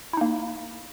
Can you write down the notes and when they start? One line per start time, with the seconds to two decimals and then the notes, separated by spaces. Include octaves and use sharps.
0.13 E4
0.17 D#4
0.21 A#3